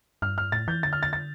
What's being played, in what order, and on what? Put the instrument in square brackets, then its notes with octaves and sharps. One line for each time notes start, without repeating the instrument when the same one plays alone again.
[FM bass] G2 [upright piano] F6
[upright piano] F6
[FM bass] A2 [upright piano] A6
[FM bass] E3 [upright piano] G6
[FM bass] D3 [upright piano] A6
[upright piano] F6
A6
A6